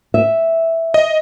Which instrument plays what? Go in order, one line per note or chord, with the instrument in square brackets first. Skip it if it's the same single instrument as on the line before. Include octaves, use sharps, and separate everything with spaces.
[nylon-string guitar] E5
[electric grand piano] D#5